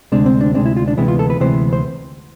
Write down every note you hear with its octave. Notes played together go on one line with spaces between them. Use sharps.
D2 C3 G#3 C4 D4
C4
D4
D2 C3 G#3 C4 D4
E4
F4
D4
D2 C3 E3 G#3 B3 E4
F4
A4
B4
D2 C3 E3 G#3 B3 C5
C5